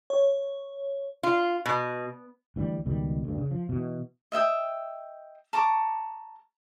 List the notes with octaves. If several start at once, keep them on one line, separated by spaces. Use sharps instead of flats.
C#5
F4
B2
D2 E3 G3
C#2 B2 D#3 G3
D2 G2
C#3
F3
B2 E3
D#5 E5 G5 D#6
A5 A#5 C#6 D6